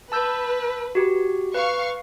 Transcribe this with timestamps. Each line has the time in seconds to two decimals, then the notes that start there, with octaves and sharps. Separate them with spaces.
0.12 B4 A5 E6 G6
0.95 F#4 G4
1.54 B4 F5 C#6